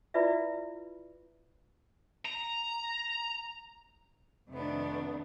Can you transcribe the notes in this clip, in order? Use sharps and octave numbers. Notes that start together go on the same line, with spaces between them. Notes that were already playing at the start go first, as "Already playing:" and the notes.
E4 F4 B4 D5 E5
A#5
F2 C3 D#3 A3 B3 D4